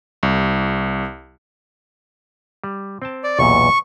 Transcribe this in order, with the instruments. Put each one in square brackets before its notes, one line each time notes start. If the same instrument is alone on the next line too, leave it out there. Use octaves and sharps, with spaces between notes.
[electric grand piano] C2
[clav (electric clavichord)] G3
C4 G5 A5
[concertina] D5
[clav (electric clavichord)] B1 E2 A#2 [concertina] C#6